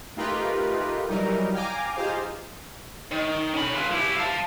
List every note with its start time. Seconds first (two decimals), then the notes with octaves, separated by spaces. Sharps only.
0.16 A3 D#4 F4 G4 A#4 B4
1.08 E3 F#3 G3 D#4 A#4
1.53 F5 G5 G#5 A#5 D6
1.96 D#4 F4 G4 G#4 C5 F5
3.11 D#3
3.53 C#4 B5
3.73 F4 B4
3.91 E4 G4
4.16 F5 A5